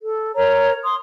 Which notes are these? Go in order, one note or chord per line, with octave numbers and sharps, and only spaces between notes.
A4
A#4 C#5 A#5
C6 D#6